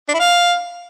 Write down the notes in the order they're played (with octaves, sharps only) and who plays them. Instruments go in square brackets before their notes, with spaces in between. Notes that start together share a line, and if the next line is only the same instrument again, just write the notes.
[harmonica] D4
E4
F5